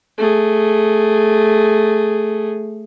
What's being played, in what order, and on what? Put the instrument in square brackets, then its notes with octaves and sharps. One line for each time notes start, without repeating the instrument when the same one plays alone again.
[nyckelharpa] A3 G#4